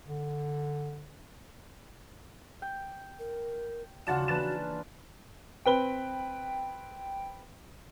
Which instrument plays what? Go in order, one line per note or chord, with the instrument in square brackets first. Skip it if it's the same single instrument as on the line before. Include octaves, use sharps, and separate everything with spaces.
[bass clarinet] D3
[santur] G5
[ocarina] A#4
[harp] D#2 C#3 [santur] D4 F4 [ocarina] F#4 [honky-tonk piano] F#5 A6 E7
[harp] E3 A#3 [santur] D4 B4 A5 [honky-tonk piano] F#6 A6 E7
[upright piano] C4 B4 G7 [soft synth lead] G5